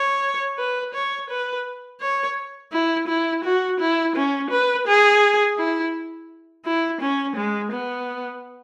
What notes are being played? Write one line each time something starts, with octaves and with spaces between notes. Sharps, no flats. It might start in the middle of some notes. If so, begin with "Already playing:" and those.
Already playing: C#5
B4
C#5
B4
C#5
E4
E4
F#4
E4
C#4
B4
G#4
E4
E4
C#4
G#3
B3